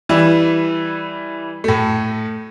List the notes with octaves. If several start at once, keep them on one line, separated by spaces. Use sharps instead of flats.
E3 G3 E4
A2 A3